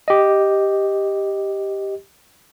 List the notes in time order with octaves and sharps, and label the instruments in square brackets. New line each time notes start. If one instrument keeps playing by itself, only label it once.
[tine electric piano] G4 D#5